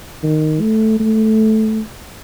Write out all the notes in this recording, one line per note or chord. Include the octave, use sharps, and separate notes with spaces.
D#3
A3
A3